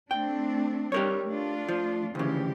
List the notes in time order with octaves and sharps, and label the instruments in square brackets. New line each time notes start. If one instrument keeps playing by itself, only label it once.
[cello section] A3 C4 D4 [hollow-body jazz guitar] G5
[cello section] G3 [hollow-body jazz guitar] G4 A#4 C#5
[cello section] A3 D4 F4
[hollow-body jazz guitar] F3
[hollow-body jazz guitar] D2 C#3 [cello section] E3 F3 G4